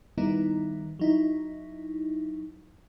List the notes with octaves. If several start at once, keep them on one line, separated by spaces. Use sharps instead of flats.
D#3 G3 B3 D#4 E4
F#3 D#4 E4